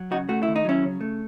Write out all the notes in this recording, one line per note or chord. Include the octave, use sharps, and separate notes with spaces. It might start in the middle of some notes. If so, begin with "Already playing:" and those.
Already playing: F#3
C#3 D#4 F#4
A3 F#4
D#2 E4
D#4
F#3 C#4 E4
C#3
A3